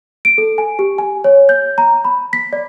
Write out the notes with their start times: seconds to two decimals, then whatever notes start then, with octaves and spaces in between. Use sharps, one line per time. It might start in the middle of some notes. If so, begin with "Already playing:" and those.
0.25 D7
0.38 A4
0.58 G#5
0.79 G4
0.98 G#5
1.24 C#5
1.49 G6
1.78 A#5
2.05 B5
2.33 B6
2.53 D5